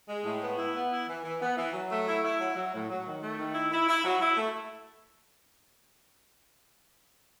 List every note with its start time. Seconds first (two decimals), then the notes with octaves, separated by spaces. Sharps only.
0.09 G#3
0.25 A2
0.42 B3
0.58 E4
0.75 B3
0.91 E4
1.08 E3
1.24 E3
1.41 B3
1.57 E3
1.73 F#3
1.90 A3
2.07 E4
2.23 E4
2.40 F#3
2.56 F#3
2.73 A2
2.89 F#3
3.05 D#3
3.22 A3
3.38 D#3
3.54 E4
3.71 E4
3.89 E4
4.05 F#3
4.21 E4
4.37 A3